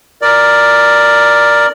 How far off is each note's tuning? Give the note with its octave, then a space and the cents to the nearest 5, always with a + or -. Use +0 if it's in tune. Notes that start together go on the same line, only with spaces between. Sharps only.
A#4 +0 D5 +5